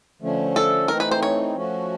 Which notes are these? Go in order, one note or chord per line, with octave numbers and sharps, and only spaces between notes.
D3 F3 A3 C#4
A4
E3 A3 C4 D#4 A#4
B4
C5
C#5
F3 A3 C#4 F#4